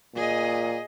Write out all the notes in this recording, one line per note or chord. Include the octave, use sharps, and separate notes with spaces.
A#2 G#4 D#5